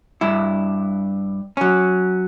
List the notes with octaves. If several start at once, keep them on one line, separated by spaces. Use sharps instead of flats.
G2 E4
F#3 C#4